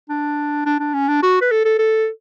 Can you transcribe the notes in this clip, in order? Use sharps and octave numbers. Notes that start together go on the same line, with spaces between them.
D4
D4
D4
C#4
D4
F#4
B4
A4
A4
A4